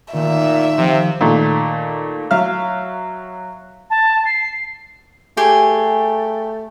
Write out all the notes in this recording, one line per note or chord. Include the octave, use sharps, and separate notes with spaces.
A#2 D#3 A3 E5
C3 F3
A#2 D#3 A3
F#3 E5 F5 F6
A5
C7
A3 G4 G#4